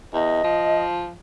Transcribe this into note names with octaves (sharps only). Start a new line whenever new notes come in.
E2 D#5
F3